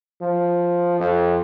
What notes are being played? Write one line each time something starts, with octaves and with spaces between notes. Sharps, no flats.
F3
F2